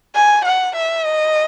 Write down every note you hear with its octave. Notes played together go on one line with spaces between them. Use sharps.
G#5
F#5
E5
D#5